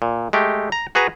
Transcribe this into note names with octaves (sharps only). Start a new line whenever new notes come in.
A#2
G#3 A3 G4
A#5
F#4 G#4 B4 A#5